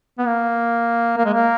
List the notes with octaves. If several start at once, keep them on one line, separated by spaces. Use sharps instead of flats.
B3
A#3
A#3
G#3
A#3